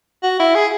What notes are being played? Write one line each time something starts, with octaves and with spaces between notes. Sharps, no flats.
F#4
E4
G#4